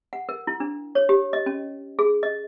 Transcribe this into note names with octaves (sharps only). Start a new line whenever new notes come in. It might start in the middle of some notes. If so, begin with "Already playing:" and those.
F#5
A#4
E4
D4
C#5
G4
D#5
C#4
G#4
D#5